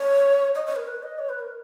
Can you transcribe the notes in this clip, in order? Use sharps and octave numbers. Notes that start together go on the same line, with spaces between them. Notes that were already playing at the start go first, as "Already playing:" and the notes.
Already playing: C#5
D#5
C#5
A#4
B4
D#5
C#5
B4
A#4